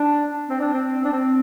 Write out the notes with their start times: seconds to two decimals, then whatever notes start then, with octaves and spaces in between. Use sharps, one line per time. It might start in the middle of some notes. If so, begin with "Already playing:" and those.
Already playing: D4
0.49 C4
0.61 D4
0.73 C4
1.04 D4
1.13 C4